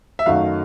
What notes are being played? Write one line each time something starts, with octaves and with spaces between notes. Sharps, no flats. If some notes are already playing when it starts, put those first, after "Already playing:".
E5
F#2 D#3 F#3 A3 F5